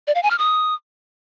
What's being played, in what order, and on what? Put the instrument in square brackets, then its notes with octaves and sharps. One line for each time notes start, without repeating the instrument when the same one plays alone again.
[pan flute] D5
F5
G#5
F6
D#6